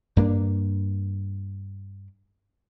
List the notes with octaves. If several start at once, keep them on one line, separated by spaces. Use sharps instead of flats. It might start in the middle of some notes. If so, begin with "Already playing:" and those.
G2 A#3 D4